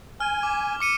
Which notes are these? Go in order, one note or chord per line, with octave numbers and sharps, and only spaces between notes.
G#5 F6
D6
D6 C#7 D#7